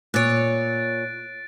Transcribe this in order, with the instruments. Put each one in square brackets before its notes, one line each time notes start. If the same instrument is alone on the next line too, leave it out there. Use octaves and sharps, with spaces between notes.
[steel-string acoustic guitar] A#2 C#5 [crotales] F#6 A6 D7